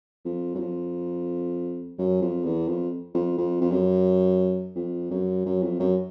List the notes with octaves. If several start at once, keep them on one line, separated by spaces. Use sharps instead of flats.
F2
F#2
F2
F#2
F2
E2
F2
F2
F2
F2
F#2
F2
F#2
F#2
F2
F#2